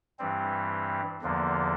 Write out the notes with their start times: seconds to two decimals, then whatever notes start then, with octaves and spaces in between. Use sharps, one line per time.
0.19 G2 E3 G3 C4
1.22 E2 D3 F3 A#3